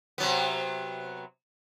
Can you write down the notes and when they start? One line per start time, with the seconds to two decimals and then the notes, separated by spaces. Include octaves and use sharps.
0.18 C3 F#3 B3